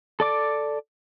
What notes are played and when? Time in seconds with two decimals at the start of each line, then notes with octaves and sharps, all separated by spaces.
0.20 A4 D5 D6